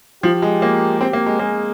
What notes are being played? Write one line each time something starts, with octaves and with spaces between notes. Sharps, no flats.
F3 G4
G#3
A#3
C4 G4
A#3
G#3
A#3 G#4